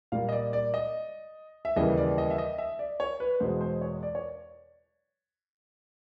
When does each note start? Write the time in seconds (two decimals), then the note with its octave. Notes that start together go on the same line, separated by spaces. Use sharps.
0.12 A#2 G3 A#3 F5
0.29 D#5
0.32 D5
0.53 D5
0.74 D#5
1.65 E5
1.76 D#2 C#3 E3 G3 A#3 D#5
1.98 D5
2.18 D#5
2.30 E5
2.38 D#5
2.58 E5
2.79 D5
3.00 C#5
3.20 B4
3.40 E2 B2 G#3 C5
3.61 C5
3.81 C#5
4.03 D5
4.15 C#5